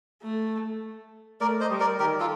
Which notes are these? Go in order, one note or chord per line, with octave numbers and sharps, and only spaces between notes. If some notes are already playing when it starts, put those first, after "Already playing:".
A3
A3 A#4 D5
C5 D#5
G3
A#4 D5
D#3 G4 A#4
F4 A4